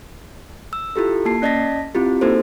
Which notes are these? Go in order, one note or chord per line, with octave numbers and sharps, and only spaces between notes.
E6
E4 F4 G4 A4
A#3 A5 C7
C#4 D5 D#5 A5 A#6 B6
C4 E4 F4 G4
A#3 D#4 F#4 A4 C5